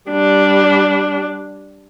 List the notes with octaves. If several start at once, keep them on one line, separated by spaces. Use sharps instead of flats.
G3 D4